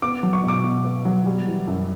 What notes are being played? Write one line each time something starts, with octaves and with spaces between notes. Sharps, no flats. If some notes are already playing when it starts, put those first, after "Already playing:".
B3 D6
F#3
C#6
B2 D6
B2
B3
F#3
G3
E3
F#2